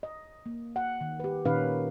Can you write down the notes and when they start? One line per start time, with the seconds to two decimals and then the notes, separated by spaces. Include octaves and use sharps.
0.03 D#5
0.46 A#3
0.76 F#5
1.01 D#3
1.20 G4 B4
1.45 A#2 D#3 C#4 D#4 B4 F5